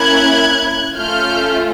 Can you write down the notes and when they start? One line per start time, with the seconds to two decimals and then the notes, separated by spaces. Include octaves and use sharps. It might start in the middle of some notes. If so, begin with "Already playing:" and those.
Already playing: A#3 C#4 E4 F#6 G#6
0.97 A3 C#4 F4 F6 G6